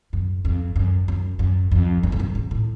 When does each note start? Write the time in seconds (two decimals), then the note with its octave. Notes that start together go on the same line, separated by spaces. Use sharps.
0.13 F#2
0.45 F2
0.76 F#2
1.08 F#2
1.39 F#2
1.72 F2
2.03 F#2
2.12 G#2
2.19 F#2
2.35 G#2
2.51 A2